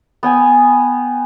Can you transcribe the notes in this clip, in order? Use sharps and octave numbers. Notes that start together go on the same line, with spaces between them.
B3 G5 G#5